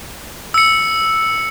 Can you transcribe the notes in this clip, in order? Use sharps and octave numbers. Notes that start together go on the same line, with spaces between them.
E6 C#7